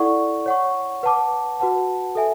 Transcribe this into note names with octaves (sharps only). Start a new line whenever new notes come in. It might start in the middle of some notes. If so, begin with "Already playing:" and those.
Already playing: E4 A4 D5 F#5 C#6
C#5 F#5 C#6
B4 F#5 A5 D6
F#4 B4 F#5 A5
A4 E5 G#5